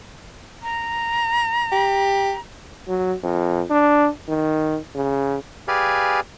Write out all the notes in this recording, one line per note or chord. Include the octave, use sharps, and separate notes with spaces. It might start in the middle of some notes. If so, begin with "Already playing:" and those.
A#5
G4
F#3
F2
D4
D#3
C#3
G4 G#4 B4 D5 F5 G#5